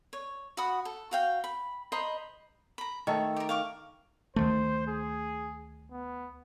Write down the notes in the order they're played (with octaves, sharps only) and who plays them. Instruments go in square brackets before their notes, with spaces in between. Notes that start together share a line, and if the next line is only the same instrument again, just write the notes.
[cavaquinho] C#5
F#4 F#5 B5 D#6
A4
F#4 F5 G5
B5
C5 D#5 A#5 B5
A#5 B5
[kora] D#3 A3 A4 [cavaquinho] C#5
[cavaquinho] G4 A#4
F5 C#6 D6
[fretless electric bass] D2 D#3 A3 [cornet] C5
[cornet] G#4
B3